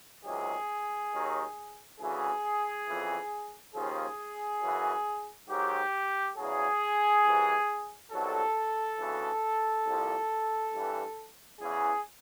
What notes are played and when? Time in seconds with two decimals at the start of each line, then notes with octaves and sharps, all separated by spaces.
0.25 C#2 C3 D#3 F#3 G#4
1.12 D#2 D#3 F#3
1.99 D2 C#3 E3 G#4
2.87 F2 C#3 E3
3.74 D#2 C#3 F3 G#4
4.62 F#2 C#3 E3
5.49 G#2 D#3 F#3 G4
6.36 E2 C#3 F#3 G#4
7.23 C2 C3 E3
8.11 C2 B2 F#3 A4
8.98 D2 C#3 E3
9.86 C2 A#2 F3
10.73 G2 E3
11.61 E2 C#3 E3 G#4